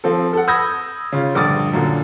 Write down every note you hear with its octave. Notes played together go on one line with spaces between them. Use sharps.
F3 C4 A4
A4 F#5
B5 D#6 E6 G6 G#6 A#6
C#3 F4
A#1 G2 D3 D6 D#6 A6
F#2 A#2 D3